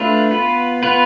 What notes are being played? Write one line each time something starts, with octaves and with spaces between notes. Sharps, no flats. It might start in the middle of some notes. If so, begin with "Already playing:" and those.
Already playing: A3 D4 F4 B4
B3 F4 B4
B3 F4 B4